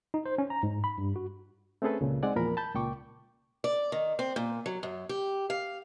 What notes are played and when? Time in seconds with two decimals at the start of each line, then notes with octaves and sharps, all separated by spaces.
0.14 D#4
0.26 C5
0.38 C#4
0.50 A#5
0.63 G#2
0.84 B5
0.98 G2
1.16 F#4
1.82 A3 C4 C#4 G#4 A4 B4
2.01 C#2 A#2 C#3
2.23 G#3 C4 D#4 D5 F#5 G#5
2.36 E2 A#2 F3 A#4 B5
2.57 A5 B5 G6
2.75 C#2 A#2 G5 C#6 D6
3.64 D5
3.92 D#3
4.19 C4
4.36 A#2
4.66 F#3
4.83 F#2
5.09 G4
5.50 F5